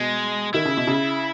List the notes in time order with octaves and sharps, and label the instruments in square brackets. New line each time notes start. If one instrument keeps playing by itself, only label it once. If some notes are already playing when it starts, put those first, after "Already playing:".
Already playing: [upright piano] B2 [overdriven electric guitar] G#3
[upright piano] D#3 [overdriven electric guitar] E4
[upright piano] C#3
B2
C#3